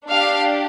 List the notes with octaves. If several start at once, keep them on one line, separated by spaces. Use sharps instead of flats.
D4 G4 F5